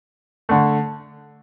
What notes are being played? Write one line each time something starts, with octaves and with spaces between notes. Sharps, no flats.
D3 A3